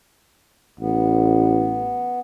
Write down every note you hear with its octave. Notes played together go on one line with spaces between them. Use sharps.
A1 B3